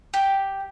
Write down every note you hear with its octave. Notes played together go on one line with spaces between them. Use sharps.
G4